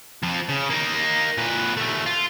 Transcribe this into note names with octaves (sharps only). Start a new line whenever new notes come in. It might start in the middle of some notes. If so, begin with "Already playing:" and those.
F2 F3
C#3
A#3 D#4
A#2 B4
D#2 A3
F4